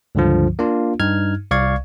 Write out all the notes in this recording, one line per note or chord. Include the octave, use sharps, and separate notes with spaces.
C#2 G2 D3 F3
A#3 D4 F4
G2 D#4 F6 G#6
C2 D5 F5 C#6 G#6